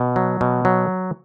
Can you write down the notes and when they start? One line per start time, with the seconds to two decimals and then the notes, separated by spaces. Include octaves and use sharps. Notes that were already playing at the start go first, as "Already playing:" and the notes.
Already playing: B2
0.16 F#3
0.41 B2
0.65 F#3